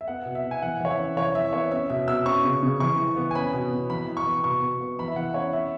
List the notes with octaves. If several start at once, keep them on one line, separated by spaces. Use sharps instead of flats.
E5
B3 F#5
B2
E5
B2
G#5
E3 F#5
E3 C#5
E5
C#4
E3 C#5
E3 E5
B3 C#5
C#4 E5
B2 E5
B2 E6
C#4 C#6
C#3
C#3
E3 C#6
E3
B3
G#5
C#4 B5
B2
B2
E3 B5
E3
C#6
B3
B2 C#6
B2
B3
E3 B5
E5
E3 F#5
C#4 C#5
C#4 E5